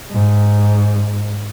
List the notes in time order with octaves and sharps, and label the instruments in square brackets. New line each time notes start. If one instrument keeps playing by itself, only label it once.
[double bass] G#2